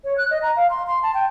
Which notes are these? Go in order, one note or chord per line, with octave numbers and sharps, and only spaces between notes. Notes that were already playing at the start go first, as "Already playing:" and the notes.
C#5
F#6
D#5
A#5
F5
C6
C6
A5
G5